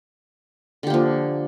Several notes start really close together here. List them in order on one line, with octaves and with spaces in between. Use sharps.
D3 G4 A#3 F3